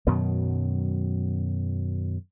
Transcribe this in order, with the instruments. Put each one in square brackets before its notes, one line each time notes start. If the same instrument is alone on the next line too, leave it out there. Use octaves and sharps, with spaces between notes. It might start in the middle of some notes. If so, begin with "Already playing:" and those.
[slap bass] F#2 B2 D#3 F#3